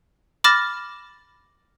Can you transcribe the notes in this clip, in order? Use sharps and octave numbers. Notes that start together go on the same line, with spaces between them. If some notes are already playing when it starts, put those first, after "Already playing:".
B5 D6 F6 A6 A#6 E7